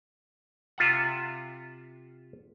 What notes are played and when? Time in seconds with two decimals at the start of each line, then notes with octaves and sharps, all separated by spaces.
0.78 C3 F4 E5 F#5